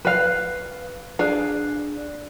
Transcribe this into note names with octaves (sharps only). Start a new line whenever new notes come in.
B4 F5
D4 G#4 F5